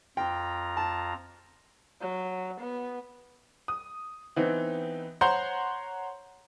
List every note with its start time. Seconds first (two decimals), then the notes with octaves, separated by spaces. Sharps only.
0.17 F2 F4 G5 A#5
0.77 A5
2.01 F#3
2.60 B3
3.68 D#6
4.36 E3 B3 C4 D#4
5.21 C5 C#5 F#5 A#5 C6 G6